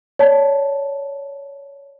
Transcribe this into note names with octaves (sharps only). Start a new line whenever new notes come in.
C#5 D5 A5